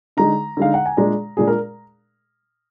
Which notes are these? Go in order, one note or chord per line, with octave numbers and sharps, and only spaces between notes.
D3 G#3 D#4 A#5
D3 G#3 D#4 F5
F#5
G#5
A#2 G#3 D4 A#5
A#2 G#3 D4 G#4
A#4